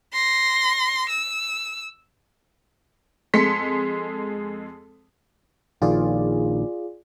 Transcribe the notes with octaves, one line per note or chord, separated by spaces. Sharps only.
C6 A#6
E6
F2 G#3 A4 C6 B6 C#7
A#1 D#3 F4 G#4 D5